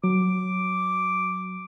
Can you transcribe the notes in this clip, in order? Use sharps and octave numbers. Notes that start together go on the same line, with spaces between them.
F#3 D6